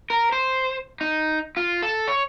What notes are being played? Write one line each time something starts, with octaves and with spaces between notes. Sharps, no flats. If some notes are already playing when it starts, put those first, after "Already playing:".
A#4
C5
D#4
F4
A4
C#5